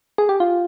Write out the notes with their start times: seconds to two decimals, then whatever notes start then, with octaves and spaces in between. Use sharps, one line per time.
0.18 G#4
0.29 G4
0.40 F4